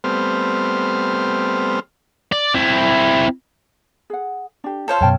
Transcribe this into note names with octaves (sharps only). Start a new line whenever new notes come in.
G3 A3 B3 C4 C5 F6
D5
C4 E4
G#4 F#5
D4 G4
F4 A4 C5 C#5 F5 A5
F#2 B2 C#5 G5 A5